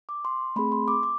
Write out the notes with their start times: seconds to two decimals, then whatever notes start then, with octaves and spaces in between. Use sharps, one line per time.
0.09 D6
0.25 C6
0.56 A3 C4 G#4 B5
0.72 C6
0.88 D6
1.03 D6